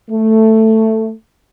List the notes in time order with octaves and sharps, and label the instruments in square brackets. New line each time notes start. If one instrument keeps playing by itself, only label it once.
[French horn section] A3